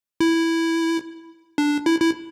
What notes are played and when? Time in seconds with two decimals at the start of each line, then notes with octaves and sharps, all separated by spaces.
0.20 E4
1.58 D4
1.86 E4
2.01 E4